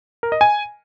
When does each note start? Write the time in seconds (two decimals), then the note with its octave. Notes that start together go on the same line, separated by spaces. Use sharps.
0.23 A#4
0.32 D#5
0.41 G#5